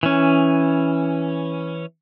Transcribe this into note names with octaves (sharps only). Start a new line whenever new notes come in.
E3 C#4